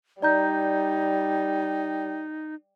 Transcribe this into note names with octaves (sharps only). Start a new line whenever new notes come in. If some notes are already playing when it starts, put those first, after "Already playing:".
G3 D#4 D5 A#5 G6